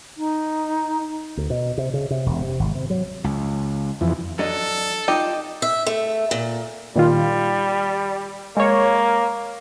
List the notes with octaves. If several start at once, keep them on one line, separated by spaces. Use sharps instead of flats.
D#4
D2
B2
C3
C#3
C3
E1
C3
G#1
C3
F#3
C#2
F2 E3
F#3 D4 A4 D#5
D#4 F4 G4 D#5
E5
A3
A#2
A#2 D#3 G3 F4
G#3 A#3 C#5